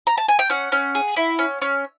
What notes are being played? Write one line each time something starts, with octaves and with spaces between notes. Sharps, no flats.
A#5
A5
G#5
G5
C#4 F#5
C#4
G#4
E4
C#4
C#4